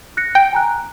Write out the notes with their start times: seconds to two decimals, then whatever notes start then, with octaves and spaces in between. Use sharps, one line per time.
0.17 F#6 A#6 C#7
0.35 G5 D7
0.53 G#5 A#5 F#6